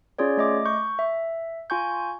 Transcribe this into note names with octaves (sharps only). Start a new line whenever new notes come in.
C#4 F4 G#4 C#5 D5
A3 D#5 D6
C#6 G6
E5
F4 G#5 C#6 G6